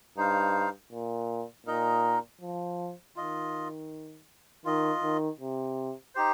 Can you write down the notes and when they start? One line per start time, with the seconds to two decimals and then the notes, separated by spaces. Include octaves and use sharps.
0.17 G2 D#4 C5 F5
0.92 A#2
1.66 A#2 D#4 A#4 D#5
2.41 F3
3.16 D#3 F4 D#5
4.65 D#3 F4 D#5
5.03 D#3
5.40 C3
6.15 D#4 G4 C5